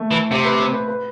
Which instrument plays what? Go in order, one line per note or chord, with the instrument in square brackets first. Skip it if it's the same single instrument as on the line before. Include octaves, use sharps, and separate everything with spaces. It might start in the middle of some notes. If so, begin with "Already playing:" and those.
Already playing: [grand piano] A3
[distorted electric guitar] E3
[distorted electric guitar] C3 [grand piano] C4
[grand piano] B4
C5
B4
B4